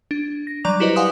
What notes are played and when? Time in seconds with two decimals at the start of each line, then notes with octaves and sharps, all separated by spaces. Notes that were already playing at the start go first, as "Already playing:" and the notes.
0.11 D4
0.47 A#6
0.64 F#3 G3 D5 A#5 D6 F7
0.80 E4 F#4 G4 B4 C5 D#5
0.96 F5 F#5 G#5 C6 D#6